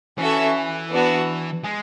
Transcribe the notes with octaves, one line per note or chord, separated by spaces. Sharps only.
E3 C#4 F#4 A4 E5
B3 D4 F#4
G#3